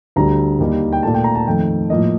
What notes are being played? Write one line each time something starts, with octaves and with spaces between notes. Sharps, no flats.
D2 D3 G3 A#5
D#2 D#3 G3 A#3
G5
A#2 A3 A5
G5
A#5
A5
F2 D#3 A3 G5
A2 F3 A#3 D#5